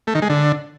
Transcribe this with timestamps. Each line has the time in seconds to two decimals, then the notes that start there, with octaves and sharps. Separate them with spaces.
0.07 A3
0.15 D#3
0.22 G#3
0.30 D3